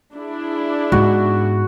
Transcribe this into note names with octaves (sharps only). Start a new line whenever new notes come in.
D4 E4 G#4
G#2 B3 F#4